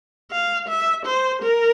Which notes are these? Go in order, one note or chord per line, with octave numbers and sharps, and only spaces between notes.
F5
E5
C5
A#4